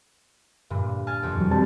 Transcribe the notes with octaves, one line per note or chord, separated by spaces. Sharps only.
G2 A#2 D3
G#5 A5 F6
F2 B2 G4
E2 F#3
D#1 G3 C4 A5